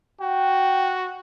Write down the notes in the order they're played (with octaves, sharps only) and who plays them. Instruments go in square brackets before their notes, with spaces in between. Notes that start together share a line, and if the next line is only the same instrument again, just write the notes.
[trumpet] F#4 [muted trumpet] G5